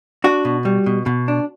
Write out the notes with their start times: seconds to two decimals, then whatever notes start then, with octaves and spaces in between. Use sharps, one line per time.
0.24 D4 F#4
0.45 B2
0.65 G3
0.86 B2
1.06 B2
1.28 D4